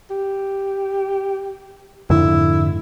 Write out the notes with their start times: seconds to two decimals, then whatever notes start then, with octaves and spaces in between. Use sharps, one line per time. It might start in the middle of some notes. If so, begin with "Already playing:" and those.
0.10 G4
2.10 F2 G#2 D3 E4